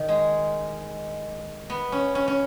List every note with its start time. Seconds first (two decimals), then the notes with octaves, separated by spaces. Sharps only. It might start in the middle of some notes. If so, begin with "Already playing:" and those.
Already playing: D#3
0.09 G#3
1.70 B3
1.92 C#4
2.15 C#4
2.28 C#4